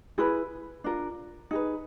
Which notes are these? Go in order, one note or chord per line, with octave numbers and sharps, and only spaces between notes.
E4 G#4 B4
D4 F4 A#4
D#4 G#4 B4